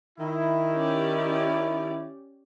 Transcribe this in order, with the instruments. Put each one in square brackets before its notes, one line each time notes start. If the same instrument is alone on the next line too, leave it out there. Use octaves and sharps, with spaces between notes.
[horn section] D#3 E4
[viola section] C#4 G4 D5